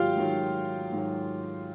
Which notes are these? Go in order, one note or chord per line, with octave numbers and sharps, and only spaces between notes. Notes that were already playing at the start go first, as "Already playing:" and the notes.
Already playing: G#2 D#3 F#3 F4 G4 F5 G5
G#2 D#3 F#3
G#2 D#3 F#3